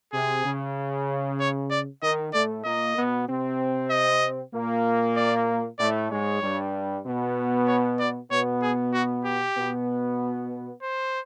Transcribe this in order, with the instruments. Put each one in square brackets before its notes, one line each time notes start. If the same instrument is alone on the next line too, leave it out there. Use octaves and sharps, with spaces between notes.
[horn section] C3 [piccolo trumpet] G#4
[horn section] C#3
[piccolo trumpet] C#5
D5
[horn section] D#3 [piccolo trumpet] D#5
[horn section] A2 A3 [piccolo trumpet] D5
[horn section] A#2 A#3 [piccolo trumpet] D#5
[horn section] B2 B3
C3 C4
[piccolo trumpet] D#5
[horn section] A#2 A#3
[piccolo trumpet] D5
[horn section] A2 A3 [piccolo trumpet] D5
[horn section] G#2 G#3 [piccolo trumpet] C#5
[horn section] G2 G3
B2 B3
[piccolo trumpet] C#5
D5
[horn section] B2 B3 [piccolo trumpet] C#5
[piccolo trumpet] G#4
F#4
G4
[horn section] B2 B3
[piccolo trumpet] C5